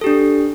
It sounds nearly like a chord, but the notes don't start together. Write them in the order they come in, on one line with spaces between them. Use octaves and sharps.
A4 G4 D4